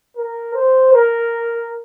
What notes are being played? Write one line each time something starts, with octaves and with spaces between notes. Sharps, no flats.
A#4
C5
A#4